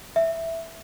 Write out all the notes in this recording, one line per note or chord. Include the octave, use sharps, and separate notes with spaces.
E5